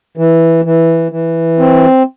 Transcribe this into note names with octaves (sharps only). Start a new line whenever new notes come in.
E3
E3
E3
C4